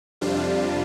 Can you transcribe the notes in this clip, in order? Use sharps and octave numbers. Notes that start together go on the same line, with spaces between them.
F2 C3 G3 D4 F4